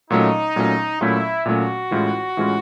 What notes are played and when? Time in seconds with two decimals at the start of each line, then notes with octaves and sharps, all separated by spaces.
0.10 A#2 F#3 A3 C#4 D#4
0.56 A#2 F#3 A3 C#4
1.01 A#2 F#3 A3 C#4 E4
1.46 A#2 F#3 A3 C#4 F#4
1.91 A2 E3 G#3 C#4 F4
2.37 A2 E3 G#3 C#4 F4